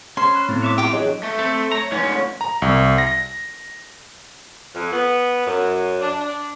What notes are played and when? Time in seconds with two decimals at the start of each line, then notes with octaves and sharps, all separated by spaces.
0.17 C#4 C5 C6
0.31 B5 F#6
0.49 A2 B3 C4 E4
0.62 C#5 E5 D6
0.78 F4 G4 G5 D6
0.93 E3 F#3 D4 G#4 C#5 D#5
1.23 A3
1.39 C4 A4
1.72 C#5 A#5
1.92 G#2 A3 C#4 F4 C#5
2.41 A#5
2.62 C2
2.98 A#6
4.75 F2
4.93 B3
5.47 F#2
6.02 D4
6.21 D4